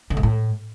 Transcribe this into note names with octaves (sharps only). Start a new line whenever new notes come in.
D3
G#2
A2